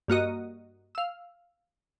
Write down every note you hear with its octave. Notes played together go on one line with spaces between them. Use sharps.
G2 A#3 F#4 D#5
F5 E6